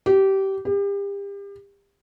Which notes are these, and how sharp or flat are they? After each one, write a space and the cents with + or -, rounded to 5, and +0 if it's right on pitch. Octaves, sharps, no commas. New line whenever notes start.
G4 -20
G4 +35